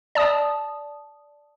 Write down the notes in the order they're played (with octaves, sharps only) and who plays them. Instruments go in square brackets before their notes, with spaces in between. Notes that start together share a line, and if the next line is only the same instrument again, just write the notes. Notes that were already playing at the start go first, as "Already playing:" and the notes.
[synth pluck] D5 A5 D#6